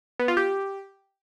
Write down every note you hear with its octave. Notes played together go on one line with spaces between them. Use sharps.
B3
F4
G4